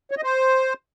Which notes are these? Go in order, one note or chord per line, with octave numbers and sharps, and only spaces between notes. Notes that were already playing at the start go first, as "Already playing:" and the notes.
C#5
D#5
C5